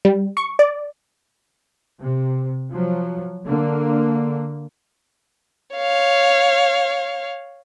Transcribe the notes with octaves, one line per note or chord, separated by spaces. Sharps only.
G3
C#6
D5
C3
F3 F#3
D3 A#3
C#5 F5